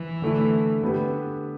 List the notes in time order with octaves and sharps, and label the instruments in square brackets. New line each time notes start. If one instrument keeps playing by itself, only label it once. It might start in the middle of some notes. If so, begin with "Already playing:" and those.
Already playing: [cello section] E3
[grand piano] D3 A3 E4
D3 B3 G4 B4